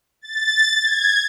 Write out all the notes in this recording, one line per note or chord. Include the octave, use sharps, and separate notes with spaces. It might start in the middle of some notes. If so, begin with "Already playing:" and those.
A6
G#6